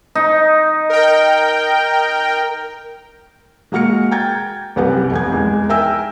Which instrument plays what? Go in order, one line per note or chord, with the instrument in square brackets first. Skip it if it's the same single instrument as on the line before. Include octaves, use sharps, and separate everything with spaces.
[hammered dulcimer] D#4
[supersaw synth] A#4 G5
[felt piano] G#3 A#3 F#4 F6 C#7
G5 A#5 G#6 A6
C2 F#2 B3 G4 F#5
F1 G#5 G#6
E2 G#3
A#4 E5 G5 G#5 E6